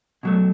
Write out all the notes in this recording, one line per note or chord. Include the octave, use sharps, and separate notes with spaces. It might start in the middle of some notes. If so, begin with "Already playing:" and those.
B2 F#3 A3